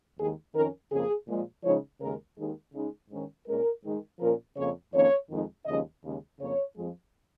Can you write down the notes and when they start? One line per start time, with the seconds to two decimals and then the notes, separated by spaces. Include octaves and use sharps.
0.18 D#2 D#3 G#3 G#4
0.54 F2 D#3 C#4 A#4
0.91 F2 C#3 F3 A#3 G#4
1.28 A#2 F3 G#3
1.63 C#3 F3 G#3 D#4 C#5
2.01 D#2 C#3 G#3 A#4
2.37 D#2 D#3 G#3
2.73 C#3 G#3 D#4
3.10 G#2 D#3 C#4
3.47 A#2 G#3 C#4 A#4
3.83 G#2 D#3 G#3
4.20 A#2 F3 C#4 A#4
4.56 F2 C#3 A#3 C#5
4.93 F2 D#3 A#3 C#4 C#5
5.30 F2 D#3 G#3 D#4
5.66 D#2 C#3 F3 G#3 C#4 D#5
6.03 D#2 C#3 G#3 C#4
6.39 F2 C#3 A#3 C#4 C#5
6.76 F2 F3 G#3